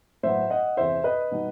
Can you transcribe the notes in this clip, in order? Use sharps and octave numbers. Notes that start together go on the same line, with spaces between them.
A2 F#3 B3 C5 E5
D#5 F#5
E2 C3 E3 C5 E5
B4 D#5
B2 G3 D#4